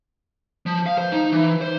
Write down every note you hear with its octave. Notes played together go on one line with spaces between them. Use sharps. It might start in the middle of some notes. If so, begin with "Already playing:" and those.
F3
F5
C5
D#4
E3
C5